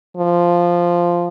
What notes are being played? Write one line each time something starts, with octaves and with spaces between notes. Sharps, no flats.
F3